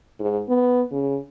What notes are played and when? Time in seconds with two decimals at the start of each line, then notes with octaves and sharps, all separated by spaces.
0.20 G#2
0.49 B3
0.92 C#3